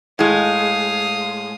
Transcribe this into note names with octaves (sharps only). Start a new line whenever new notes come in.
A2 G#3 F5 D#6